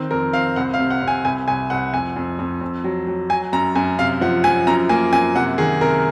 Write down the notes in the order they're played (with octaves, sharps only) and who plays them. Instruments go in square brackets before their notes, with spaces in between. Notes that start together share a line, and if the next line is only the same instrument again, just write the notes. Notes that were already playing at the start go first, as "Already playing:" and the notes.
Already playing: [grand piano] D#3 C4
F2 A#4
C4 F5
C2 F#5
F5
C3
F#5
C3
G#5
C2 G#5
C2 G#5
C2 F#5
F2 G#5
F2
F2
F2
F#3
F#3
F#3 G#5
F#2 A#5
F#2 G#5
C3 F5
F3 F#5
F3 G#5
F#2 A#5
A#3 G#5
F#2 G#5
C3 F#5
D#3 G#4
C3 A#4